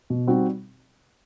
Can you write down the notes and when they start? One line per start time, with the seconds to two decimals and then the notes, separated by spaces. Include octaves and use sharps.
0.10 B2
0.27 G3 C4 D#4 F#4